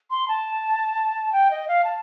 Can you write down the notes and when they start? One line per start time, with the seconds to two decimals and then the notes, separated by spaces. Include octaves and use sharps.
0.11 C6
0.28 A5
1.33 G5
1.51 D#5
1.68 F5
1.84 A5